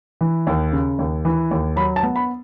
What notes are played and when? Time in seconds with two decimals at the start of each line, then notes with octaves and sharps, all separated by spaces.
0.21 E3
0.47 D#2
0.72 C#3
0.99 D#2
1.25 E3
1.51 D#2
1.76 F#3 B5
1.96 A5
2.03 B3
2.16 B5